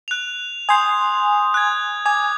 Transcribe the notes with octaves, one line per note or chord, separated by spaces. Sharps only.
F#6 F7
G#5 C6 D#6 G6
F#6 G#6
G#5 D6 G#6